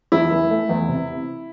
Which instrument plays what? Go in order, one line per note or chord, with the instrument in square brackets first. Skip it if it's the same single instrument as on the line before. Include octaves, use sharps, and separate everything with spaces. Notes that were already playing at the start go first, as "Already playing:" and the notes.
[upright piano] E2 [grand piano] E4
[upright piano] E3
A3
E2
C3